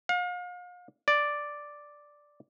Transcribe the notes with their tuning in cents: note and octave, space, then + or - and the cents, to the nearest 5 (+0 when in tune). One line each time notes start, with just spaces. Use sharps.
F5 +40
D5 +0